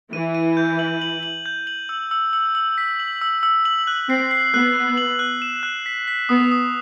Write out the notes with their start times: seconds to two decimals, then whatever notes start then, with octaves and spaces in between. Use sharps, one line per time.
0.13 E3 E4 D#7
0.35 D#7
0.57 G6
0.79 F#7
1.01 F#7
1.23 F#7
1.46 G6
1.67 F#7
1.89 E6
2.11 E6
2.33 E6
2.55 E6
2.78 B6
3.00 F#7
3.21 E6
3.43 E6
3.65 F#7
3.87 F#6
4.09 C4 C7
4.31 C7
4.53 B3 F#6
4.76 F#6
4.97 F#7
5.19 F#6
5.42 E7
5.63 F#6
5.86 B6
6.08 B6
6.29 B3 D#6
6.52 D#6